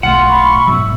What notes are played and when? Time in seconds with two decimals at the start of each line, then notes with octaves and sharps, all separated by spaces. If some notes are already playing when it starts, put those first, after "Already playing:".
0.03 B1 F3 A3 F4 F#5
0.28 B5 C#6
0.67 G#2 B2 F#3 E5